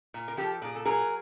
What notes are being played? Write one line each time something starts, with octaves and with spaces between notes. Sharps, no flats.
A#2
A#4
F3 G4 A4
A#2 G#4
A4
F#3 G#4 A#4